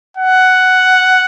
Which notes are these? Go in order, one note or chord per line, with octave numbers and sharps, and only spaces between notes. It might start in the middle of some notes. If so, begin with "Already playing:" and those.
F#5